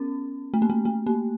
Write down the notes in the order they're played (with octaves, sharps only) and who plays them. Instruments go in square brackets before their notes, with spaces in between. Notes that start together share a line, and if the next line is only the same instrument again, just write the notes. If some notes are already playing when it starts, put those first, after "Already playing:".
Already playing: [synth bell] B3 C#4
A3
A#3
A3
A3
A#3